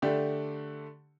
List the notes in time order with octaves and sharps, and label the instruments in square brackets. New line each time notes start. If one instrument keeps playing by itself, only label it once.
[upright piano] D3 A3 D4 G4